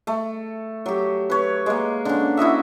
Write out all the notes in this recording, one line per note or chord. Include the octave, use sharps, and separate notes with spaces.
A3
F#3 G4
B4 C#5
G#3 A#3
D3 C#4
E4 F#4 D#5 E5